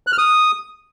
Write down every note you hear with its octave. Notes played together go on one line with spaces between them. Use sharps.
F#6
F6
D#6